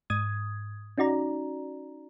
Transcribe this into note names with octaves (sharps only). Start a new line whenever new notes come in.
G#2 D#6 G#6
C#4 D#4 F#4 D5 A#5